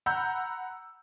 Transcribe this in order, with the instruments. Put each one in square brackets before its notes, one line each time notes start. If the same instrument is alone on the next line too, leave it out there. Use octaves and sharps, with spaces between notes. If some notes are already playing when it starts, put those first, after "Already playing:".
[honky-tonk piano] F#5 A#5 B5 E6 G6